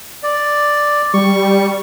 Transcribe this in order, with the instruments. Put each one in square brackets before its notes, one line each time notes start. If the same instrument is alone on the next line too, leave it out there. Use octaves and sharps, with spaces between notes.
[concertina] D5
[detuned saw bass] G3 [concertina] C#6